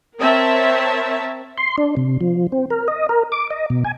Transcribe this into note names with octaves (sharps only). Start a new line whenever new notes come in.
C4 A#4 C#5 E5 A5
C6
D4
C3
F3
C4
A#4
D#5
A#4
D6
D#5
B2
G#5